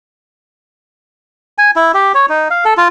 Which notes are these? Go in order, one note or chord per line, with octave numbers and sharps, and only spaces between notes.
G#5
E4
G4
C#5
D#4
F5
A4
F4